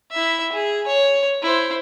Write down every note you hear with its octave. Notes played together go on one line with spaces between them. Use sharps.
E4 E5
G#4
C#5
E4 C5